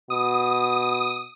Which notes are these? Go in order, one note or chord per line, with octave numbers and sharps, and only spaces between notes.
B2 D#6